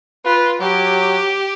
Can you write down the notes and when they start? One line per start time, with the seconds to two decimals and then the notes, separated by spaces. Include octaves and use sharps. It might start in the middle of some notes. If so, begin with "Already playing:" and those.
0.25 F4 B4
0.61 F#3 G4